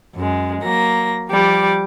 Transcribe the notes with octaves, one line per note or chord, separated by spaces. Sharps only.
F#2 G#3
F#3 A#3 A#6
F3 G3 D6